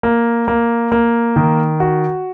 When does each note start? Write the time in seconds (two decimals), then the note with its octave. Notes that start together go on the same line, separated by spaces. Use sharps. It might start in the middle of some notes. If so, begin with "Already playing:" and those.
0.03 A#3
0.48 A#3
0.92 A#3
1.36 D#3
1.80 F#4